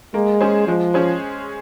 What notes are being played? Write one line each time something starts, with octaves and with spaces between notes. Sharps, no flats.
G#3 A#3
C#4 G#4 C5
F3 G#3
C#4 G#4 C5